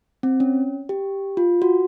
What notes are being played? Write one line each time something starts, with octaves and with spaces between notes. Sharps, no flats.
C4
C#4
G4
F4
F#4